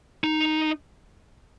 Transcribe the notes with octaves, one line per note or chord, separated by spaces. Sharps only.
D#4